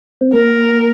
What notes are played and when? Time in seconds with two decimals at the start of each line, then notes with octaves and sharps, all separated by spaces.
0.21 C4
0.33 A#3 A#4